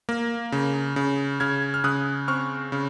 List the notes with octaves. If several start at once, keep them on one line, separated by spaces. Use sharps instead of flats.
A#3
C#3
C#3
C#3 F6 G#6
F6
C#3 D#6 F#6
C4 C#6 F6
C#3